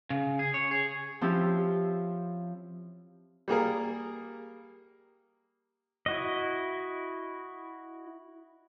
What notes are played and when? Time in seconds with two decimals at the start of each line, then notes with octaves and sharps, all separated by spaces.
0.10 C#3
0.39 G#4
0.54 C#5
0.71 G#4
1.21 F3 C4 C#4 E4 G4
3.48 G3 A#3 G#4 A#4
6.06 E4 F#4 D#5